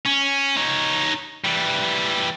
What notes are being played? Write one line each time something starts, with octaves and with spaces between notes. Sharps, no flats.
C#4
D#4 C#5
E3 G3